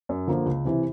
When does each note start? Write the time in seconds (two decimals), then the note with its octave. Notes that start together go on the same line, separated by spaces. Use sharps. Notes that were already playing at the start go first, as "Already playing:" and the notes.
0.09 F#2
0.27 D3 F3 A#3
0.46 C#2
0.65 C3 E3